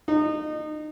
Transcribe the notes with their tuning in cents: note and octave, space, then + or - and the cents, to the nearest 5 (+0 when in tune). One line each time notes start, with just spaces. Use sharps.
D#4 -30